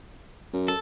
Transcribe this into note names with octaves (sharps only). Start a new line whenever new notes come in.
F#2
A4